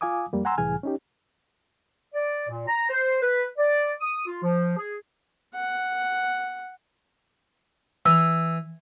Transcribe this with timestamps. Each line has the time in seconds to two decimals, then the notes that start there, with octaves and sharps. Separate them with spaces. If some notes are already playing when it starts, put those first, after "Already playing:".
0.01 F4 F5 G#5 D6 D#6
0.33 F2 G3 A#3
0.45 F#5 G#5 A#5 C6 E6
0.58 C2 A2 E3 G#4 G#5 F6
0.83 C#4 D#4 G4
2.14 D5
2.49 A#2
2.68 A#5
2.89 C5
3.22 B4
3.57 D5
4.01 D#6
4.26 F4
4.43 F3
4.77 G#4
5.55 F#5
8.06 E3 E6